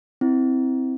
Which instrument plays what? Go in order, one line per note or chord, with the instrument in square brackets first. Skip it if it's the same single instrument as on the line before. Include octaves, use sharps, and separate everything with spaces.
[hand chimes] C4 E4